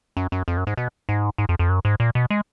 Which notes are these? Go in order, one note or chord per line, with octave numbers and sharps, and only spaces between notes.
F#2
F#2
F2
F#2
G#2
B2
G#2
G#2
F2
F2
F#2
G#2
A#2
B2
G#3